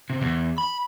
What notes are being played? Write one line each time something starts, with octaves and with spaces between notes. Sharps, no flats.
C3
E2
B5